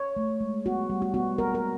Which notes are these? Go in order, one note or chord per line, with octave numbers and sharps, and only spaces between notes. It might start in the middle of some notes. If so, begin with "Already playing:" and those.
Already playing: C#5
A3
G#3
B3 F#4
G3
F#4
B3 F#4
A#3 A#4
A#4